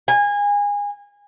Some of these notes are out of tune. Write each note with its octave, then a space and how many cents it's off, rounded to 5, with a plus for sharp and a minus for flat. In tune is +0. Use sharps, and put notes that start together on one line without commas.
G#5 -25